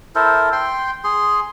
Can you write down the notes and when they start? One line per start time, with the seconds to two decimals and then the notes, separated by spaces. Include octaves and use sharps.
0.15 E4 A4 A#4 C5
0.52 G5 C6
1.04 G#4 C6